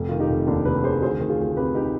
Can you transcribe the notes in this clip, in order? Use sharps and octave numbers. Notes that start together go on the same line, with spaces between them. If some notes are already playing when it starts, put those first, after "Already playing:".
Already playing: F1
D#3 F4
D#4 G4
F1
D#2 D4 F4
F1 G4 B4
D#3 G#4 C5
D2 G#4 C5
D#3
F4 G#4
D2
C3 G4 B4
D#4 G4